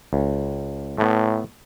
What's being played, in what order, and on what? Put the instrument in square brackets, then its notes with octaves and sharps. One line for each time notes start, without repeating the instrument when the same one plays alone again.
[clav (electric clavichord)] C#2
[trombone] A2 [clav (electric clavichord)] A3 B3